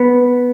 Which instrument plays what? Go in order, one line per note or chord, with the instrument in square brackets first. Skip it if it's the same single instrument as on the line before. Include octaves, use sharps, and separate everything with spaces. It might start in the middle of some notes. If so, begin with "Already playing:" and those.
Already playing: [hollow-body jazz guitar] B3